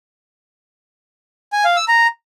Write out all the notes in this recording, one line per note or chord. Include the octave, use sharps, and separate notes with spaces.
G#5
F5
E6
A#5